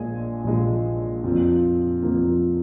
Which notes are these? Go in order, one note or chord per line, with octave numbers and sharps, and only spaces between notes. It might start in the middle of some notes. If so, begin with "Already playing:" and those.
Already playing: A#1 A#2 G#3 G#5
A#1 A#2 G#3
F2 F3 A#3
F2 F3 A#3